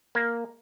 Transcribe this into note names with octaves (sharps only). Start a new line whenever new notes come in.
A#3